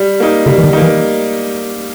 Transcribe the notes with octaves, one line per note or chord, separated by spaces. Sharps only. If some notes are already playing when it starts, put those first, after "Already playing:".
Already playing: G3
A#3 D#4
C#3 G3
E3
D#3
A#3 D#4
E3